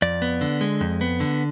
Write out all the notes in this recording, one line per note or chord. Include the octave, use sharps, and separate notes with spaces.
F2 D5
B3
D3
G#3
F2
B3
D3